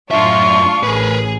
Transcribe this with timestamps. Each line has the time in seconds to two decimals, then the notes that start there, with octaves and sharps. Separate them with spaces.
0.11 F#2 A2 D4 F4 E5 C#6
0.83 A1 G#4 A#4 B4